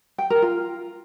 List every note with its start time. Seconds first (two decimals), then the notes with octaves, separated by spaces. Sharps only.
0.18 G5
0.30 A#4
0.42 F4